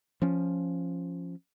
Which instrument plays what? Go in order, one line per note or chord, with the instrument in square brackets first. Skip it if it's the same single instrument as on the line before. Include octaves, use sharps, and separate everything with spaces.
[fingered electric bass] F3 C#4